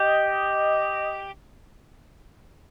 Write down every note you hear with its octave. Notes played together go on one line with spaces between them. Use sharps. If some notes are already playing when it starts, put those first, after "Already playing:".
Already playing: G4 D#5